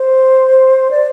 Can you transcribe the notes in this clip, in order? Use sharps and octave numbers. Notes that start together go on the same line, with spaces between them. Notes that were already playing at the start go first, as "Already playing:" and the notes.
Already playing: C5
D5